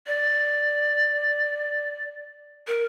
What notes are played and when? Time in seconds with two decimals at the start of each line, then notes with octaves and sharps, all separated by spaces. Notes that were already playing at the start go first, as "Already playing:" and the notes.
0.07 D5
2.68 A#4